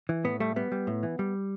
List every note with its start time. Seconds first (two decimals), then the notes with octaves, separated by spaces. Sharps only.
0.09 E3
0.24 A2 B3
0.40 G3 A3
0.56 G3 B3
0.72 G3
0.87 A2
1.03 E3
1.19 G3